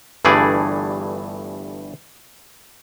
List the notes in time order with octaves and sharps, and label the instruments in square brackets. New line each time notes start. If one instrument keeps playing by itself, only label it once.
[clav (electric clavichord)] G1 G2 E3 A3 G#4 D5